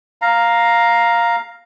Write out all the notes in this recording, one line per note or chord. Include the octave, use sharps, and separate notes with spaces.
F5 A#5